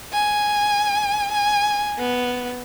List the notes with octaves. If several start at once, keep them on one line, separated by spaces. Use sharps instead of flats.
G#5
G#5
B3